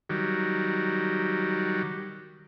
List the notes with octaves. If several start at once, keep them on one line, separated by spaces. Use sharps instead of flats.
D#3 F#3 G3